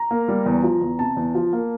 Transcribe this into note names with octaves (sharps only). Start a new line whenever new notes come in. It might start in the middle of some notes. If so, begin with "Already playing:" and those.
Already playing: A#5
A#3
G3
E2
F3
E2
C3 A5
E2
F3
A#3